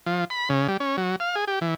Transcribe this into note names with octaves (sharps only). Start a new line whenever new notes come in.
F3
B5
C#3
G3
C#4
F#3
F5
G#4
G4
E3